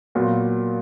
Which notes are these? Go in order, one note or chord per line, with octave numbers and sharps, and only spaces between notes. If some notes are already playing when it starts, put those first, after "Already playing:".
A#2 F#3 B3 F4